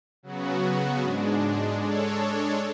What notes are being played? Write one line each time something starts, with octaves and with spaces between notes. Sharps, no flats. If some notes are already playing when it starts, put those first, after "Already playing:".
C#3 F#3 B3 F#4
G#2 G#3 D4
G#3 D4 A4 C#5